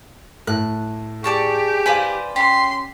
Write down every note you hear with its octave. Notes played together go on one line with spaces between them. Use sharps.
A2 F#6
G4 G#4 D5 A5 C#6
B4 C5 D5 F5 G#5
C#4 G4 C6